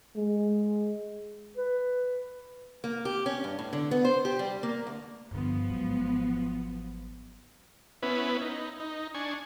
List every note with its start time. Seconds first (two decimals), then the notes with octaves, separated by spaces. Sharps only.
0.16 G#3
1.57 B4
2.84 A#3
3.05 G4
3.26 C#4
3.44 G2
3.59 A2
3.73 D3
3.91 B3
4.05 C5
4.25 G4
4.39 G3
4.63 A#3
4.87 D2
5.31 G2 D3 F3 B3
5.70 G#1 F#3
8.03 B3 C#4 E4 B4
8.41 D#4
8.80 D#4
9.14 D4 G#5 C#6